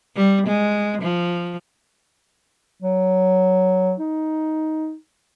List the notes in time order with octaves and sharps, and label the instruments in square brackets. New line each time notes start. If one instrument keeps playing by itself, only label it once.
[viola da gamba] G3
G#3
F3
[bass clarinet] F#3
D#4